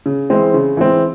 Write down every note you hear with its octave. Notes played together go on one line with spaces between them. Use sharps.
C#3
E3 G#3 C4
C#3
E3 G#3 C4